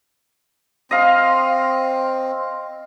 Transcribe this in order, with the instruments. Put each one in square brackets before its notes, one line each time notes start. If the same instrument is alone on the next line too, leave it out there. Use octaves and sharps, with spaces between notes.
[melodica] C4 [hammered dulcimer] D#5 F5 C6